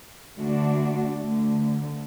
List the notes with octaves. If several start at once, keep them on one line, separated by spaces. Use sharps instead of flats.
D2 D3 A3 D4 F#4
D2 D3 A3